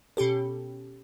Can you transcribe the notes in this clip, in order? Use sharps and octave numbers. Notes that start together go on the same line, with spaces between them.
B2 C#4 G4 A4